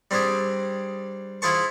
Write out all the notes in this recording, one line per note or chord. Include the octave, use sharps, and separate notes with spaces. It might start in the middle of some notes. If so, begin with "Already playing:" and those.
G3 C4 D4 G4 G#4
E4 F4 G#4 C5 A5 C#6